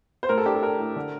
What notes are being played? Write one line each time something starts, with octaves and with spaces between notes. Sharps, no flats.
C5
A2 A#4
A4
D4 G4
A4
D4 A#4
A2
D3